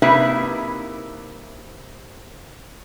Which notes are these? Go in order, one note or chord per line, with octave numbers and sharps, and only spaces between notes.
C3 A#3 D#4 E4 B4 E5